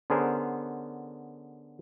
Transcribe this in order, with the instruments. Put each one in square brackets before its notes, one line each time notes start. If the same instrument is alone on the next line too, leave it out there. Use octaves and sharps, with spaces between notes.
[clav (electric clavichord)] D3 B3 C#4 G#4 A#4 C5